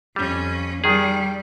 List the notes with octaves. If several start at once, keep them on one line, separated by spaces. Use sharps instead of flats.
F2 G3 C#4
D#3 G3 G#4